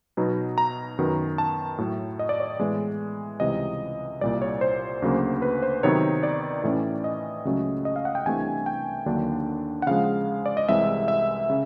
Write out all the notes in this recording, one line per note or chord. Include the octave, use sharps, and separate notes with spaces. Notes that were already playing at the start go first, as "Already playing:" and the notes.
B2 F#3 B3 D#4
A#5
F#2 D#3 F#3 B3
A5
A2 F#3 A3
D#5
D5
C#5
A2 E3 G#3 B3
C#2 C3 E3 G3 D#5
C2 A#2 G3 D5
C#5
C5
D2 C#3 F#3 A#3
B4
C5
C3 D#3 F#3 B3 D#4 C#5
D5
A2 E3 A3 C#4
D#5
C#2 C#3 F#3 A3 C#4
D#5
F5
F#5
G5
C2 C3 E3 A3 D4 G#5
G5
D#2 D3 F#3 A#3 D4
F#5
C#3 F3 G#3 F5
D5
D#5
C2 C3 E3 G#3 E5
E5
C#3